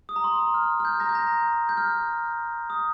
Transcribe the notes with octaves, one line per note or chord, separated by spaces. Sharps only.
D#6
A#5
C6
C6
F6
F6
G6
A#5 A#6
G6
A#5 A#6
G6
F6
D#6